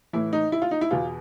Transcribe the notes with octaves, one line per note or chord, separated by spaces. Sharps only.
A2 E3 E4
D#4
E4
F4
D#4
E4
E2 B2 F4